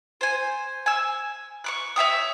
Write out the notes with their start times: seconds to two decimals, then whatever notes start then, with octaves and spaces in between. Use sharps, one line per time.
0.21 C5 G#5
0.86 G#5 E6
1.64 C#6 D6 F#6
1.96 C#5 E5 G5 D#6